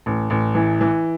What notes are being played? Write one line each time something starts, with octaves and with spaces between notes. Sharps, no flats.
A1
A1
E3
E3